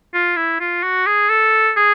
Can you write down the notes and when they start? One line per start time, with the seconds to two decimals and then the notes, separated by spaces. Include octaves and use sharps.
0.14 F4
0.36 E4
0.60 F4
0.83 F#4
1.07 G#4
1.29 A4
1.77 G#4